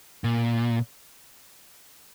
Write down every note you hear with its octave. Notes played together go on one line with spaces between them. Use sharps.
A#2